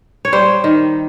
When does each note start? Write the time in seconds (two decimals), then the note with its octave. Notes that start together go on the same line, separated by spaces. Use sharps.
0.25 C#5
0.32 G3 C5
0.64 D#3